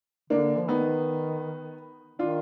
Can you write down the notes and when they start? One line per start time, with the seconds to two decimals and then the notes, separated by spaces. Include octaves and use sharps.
0.30 D3 A#3 D4
0.57 F3
0.68 D#3 B3 D#4
2.19 D#3 D4 F4